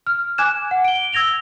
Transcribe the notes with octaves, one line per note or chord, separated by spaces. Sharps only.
F6
G#5 D6 F#6 G#6 E7
F#5
D7 G7
E6 G#6 A#6 F7 G7